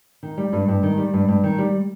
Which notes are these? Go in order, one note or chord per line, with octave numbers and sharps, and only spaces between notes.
D#3
G3
G2
G2
D#3
G3
G2
G2
D#3
G3